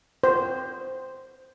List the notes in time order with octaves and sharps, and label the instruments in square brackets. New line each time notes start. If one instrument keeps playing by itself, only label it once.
[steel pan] C5